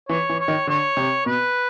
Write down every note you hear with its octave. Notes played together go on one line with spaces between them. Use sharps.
E3 C#5
E3
C#5
D#3
D3 C#5
C3
B2 B4